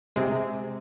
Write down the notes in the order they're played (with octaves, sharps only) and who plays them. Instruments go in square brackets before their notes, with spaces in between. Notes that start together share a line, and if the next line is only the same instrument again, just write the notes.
[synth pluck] C3 G#3